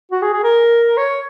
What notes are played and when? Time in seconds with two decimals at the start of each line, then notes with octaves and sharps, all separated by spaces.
0.11 F#4
0.22 G#4
0.33 G#4
0.43 A#4
0.97 C#5